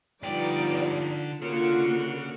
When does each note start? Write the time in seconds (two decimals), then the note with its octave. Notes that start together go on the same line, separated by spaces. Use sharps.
0.23 D3 F3 G3 B3 D#4 D5 G5
1.42 D3 A#3 F4 F#4 G#4 C#5 C#7